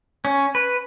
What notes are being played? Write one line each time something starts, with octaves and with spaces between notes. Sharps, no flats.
C#4
B4